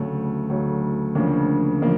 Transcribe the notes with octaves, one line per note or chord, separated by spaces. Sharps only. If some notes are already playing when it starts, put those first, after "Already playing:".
Already playing: D2 C#3 F#3 A3
D2 C#3 F#3 A3
D2 C#3 F3 A#3 D4
C#3 F3 A#3